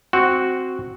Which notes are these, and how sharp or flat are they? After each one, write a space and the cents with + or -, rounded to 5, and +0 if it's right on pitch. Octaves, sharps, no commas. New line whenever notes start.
C4 +0 F#4 +0